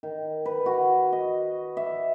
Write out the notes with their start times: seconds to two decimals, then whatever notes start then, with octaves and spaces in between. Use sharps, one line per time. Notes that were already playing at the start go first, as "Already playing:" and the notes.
0.03 D#3
0.46 B4
0.66 F#4
1.12 D#5
1.77 E5